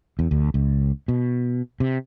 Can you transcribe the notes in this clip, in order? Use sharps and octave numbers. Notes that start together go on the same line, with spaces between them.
E2
D2
C#2
B2
C3